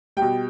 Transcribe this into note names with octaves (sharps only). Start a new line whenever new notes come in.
B2 G3 G5